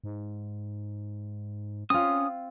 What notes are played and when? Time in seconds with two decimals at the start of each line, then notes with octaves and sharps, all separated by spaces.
0.04 G#2
1.90 C4 C#4 F4 D#6